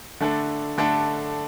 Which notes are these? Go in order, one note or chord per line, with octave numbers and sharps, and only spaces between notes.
D3 A3 D4 A4
D3 A3 D4 A4